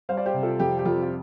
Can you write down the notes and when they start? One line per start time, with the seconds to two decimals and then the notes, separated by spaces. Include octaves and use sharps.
0.09 G3 C5 F5
0.17 D5
0.26 G4 C5
0.34 C3
0.42 F4 A4
0.60 F2 G4
0.79 G4
0.85 F2 F4
1.02 F4